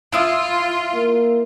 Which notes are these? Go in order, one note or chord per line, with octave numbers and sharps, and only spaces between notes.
E4 F4 E5 D#6
A#3